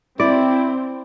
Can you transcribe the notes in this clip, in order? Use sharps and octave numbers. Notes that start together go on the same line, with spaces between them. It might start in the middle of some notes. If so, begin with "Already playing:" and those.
C4 E4 D5